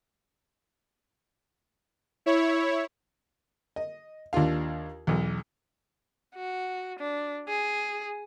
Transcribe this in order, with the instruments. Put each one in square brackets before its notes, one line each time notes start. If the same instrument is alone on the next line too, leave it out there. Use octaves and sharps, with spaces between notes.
[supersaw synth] E4 C#5
[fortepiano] D#5
D#2 D4 F4 F5
B1 E2
[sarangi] F#4
D4
G#4